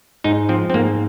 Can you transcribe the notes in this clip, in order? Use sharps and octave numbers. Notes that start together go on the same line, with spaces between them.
G#2 D#4
F3 C4
C4
G#2 A#3